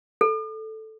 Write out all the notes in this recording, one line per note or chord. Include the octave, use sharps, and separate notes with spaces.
A4